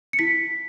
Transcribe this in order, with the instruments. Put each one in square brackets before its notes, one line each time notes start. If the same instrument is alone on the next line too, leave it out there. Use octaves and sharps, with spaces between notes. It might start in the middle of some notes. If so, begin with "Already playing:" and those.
[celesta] C#7
E4 B6